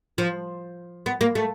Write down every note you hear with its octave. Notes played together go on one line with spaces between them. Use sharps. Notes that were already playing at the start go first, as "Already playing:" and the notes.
F3
B3
A#3
A3